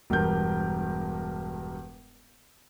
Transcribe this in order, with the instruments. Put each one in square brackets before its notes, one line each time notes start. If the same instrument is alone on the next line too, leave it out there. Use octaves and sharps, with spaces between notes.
[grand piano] E1 G2 A#4 G6